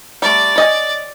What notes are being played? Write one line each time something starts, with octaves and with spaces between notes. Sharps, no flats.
G3 A3 D5
C#5 D#5 G#5